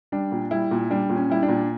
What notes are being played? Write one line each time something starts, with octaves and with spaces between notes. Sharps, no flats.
G3 D4
A#2
G3 E4
A#2
G3 D4
A#2
C#4
G3 E4
D4
A#2